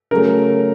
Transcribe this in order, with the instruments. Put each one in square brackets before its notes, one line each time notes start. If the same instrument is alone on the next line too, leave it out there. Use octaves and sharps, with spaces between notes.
[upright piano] C#3 F#3 A3 A#4